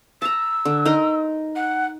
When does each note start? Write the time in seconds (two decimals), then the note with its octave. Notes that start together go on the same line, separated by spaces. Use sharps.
0.22 A5 A#5 E6
0.65 D3
0.85 D#4 A#4 C6
1.56 F#5